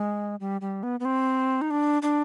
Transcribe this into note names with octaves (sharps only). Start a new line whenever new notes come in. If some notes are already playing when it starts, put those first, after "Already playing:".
Already playing: G#3
G3
G3
B3
B3
C4
D#4
D4
D4